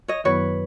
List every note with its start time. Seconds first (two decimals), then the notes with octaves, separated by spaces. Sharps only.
0.08 C#5 D#5
0.24 F#2 D#3 F#3 B3 E4 B4 C#5